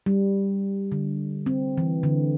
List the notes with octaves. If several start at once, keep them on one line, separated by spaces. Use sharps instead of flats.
G3
D3
C4
E3
D3